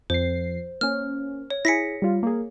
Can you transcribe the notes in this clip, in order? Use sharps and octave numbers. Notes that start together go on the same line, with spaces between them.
F2 C5 C7
A#3 C#4 F6
C#5
E4 G#4 A#6 B6 C#7
G3 F4
A#3 G#4